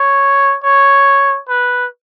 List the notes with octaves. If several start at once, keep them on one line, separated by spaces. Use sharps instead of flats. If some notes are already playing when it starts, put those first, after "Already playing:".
Already playing: C#5
C#5
B4